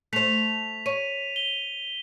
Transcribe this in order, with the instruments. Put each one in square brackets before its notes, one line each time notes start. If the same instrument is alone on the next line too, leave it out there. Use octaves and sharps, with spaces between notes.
[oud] A3 C5 [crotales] B6 F7
[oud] C#5 [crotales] D#7
[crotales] G7